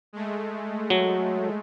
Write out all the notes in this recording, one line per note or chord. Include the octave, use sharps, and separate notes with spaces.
G#3 A3
F#3